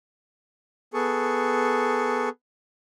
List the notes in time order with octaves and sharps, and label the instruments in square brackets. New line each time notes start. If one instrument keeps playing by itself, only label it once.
[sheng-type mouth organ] B3 G#4 A4 C#6